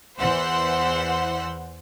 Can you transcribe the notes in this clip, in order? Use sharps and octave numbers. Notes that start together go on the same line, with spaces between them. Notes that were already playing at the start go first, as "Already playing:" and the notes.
E2 E3 C5 F#5 C6 E6